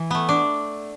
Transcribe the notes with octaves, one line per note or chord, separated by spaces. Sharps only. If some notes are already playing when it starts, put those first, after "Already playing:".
Already playing: E3
A3 B3
D4